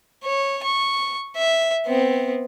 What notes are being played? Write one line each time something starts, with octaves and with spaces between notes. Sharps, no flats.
C#5
C#6
E5
B3 C4